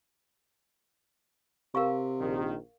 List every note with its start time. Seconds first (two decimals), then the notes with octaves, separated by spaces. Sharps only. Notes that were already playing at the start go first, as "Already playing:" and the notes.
1.75 C3 A#4 F5 C#6
2.21 A#1 D#3